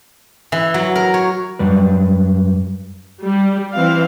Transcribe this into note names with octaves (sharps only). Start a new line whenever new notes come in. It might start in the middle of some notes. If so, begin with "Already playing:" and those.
E3
F#3
A#4
C#5
F#2 G3 B4
G3
E3 C4 F5